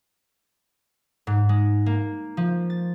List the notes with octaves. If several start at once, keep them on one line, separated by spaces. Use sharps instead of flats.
G#2
G#3
A#3
F3
A6